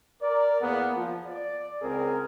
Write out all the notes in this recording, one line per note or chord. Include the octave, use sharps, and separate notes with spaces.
A#4 D5
E2 A#3 B3 G#4 F#5
F3
D5
C#2 C4 G#4 A#4